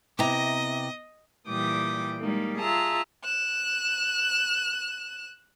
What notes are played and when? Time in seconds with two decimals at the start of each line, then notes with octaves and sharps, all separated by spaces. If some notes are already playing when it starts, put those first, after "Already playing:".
0.19 C3 B3 E4 G4 D#5 A#5
1.47 A#2 E3 G3 G5 D6 D#6
2.17 G3 G#3 A#3 D#4
2.58 F4 G#4 E5 A5 A#5
3.24 F#6 E7